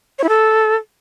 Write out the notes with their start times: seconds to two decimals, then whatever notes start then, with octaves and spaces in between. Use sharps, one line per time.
0.19 C#5
0.24 E4
0.29 A4